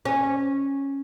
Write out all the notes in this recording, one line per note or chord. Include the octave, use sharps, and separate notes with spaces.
C#4